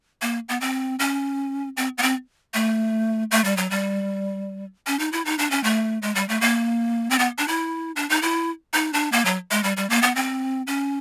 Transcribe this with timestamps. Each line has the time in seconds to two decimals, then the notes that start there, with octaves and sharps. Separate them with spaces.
0.22 A#3
0.49 B3
0.61 C4
0.99 C#4
1.77 C4
1.98 B3
2.02 C4
2.54 A3
3.31 A3
3.44 G3
3.57 F#3
3.70 G3
4.87 C#4
4.99 D#4
5.12 E4
5.25 D#4
5.38 D4
5.51 C#4
5.64 A3
6.02 G#3
6.15 G3
6.29 A3
6.41 A#3
7.10 C4
7.19 B3
7.38 D4
7.48 E4
7.96 D4
8.10 D#4
8.22 E4
8.74 D#4
8.93 D4
9.12 A#3
9.25 F#3
9.51 G#3
9.63 G3
9.77 G3
9.90 A#3
10.02 B3
10.16 C4
10.67 C#4